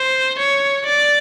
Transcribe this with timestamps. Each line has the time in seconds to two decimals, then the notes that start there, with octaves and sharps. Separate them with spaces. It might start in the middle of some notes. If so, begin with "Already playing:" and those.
Already playing: C5
0.39 C#5
0.86 D5